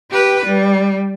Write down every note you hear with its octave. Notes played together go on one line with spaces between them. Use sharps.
G4 B4
G3